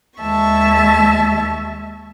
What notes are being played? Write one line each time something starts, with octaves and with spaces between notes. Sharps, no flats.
D#2 G#3 E5 A5 C#6